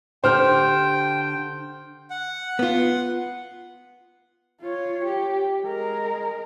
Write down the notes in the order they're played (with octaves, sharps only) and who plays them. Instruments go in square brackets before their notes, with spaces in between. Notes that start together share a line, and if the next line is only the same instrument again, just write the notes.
[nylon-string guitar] D3 G4 [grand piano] C5 F6 [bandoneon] G5
[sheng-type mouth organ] F#5
[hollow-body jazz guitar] B3 F4
[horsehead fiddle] F4 C#5
G4
G#3 A#4